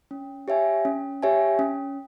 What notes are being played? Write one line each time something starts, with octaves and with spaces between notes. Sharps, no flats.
C#4
G4 C#5 E5 G#5
C#4
G4 C#5 E5 G#5
C#4